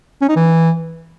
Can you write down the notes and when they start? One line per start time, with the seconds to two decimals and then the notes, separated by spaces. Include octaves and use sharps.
0.22 C#4
0.29 D#4
0.36 E3